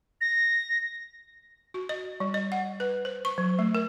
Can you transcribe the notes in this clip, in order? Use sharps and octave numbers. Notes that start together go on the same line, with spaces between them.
A#6
F#4
D#5
G3
D#5
F#5
B4
C5
C#6
F#3
A3
A#4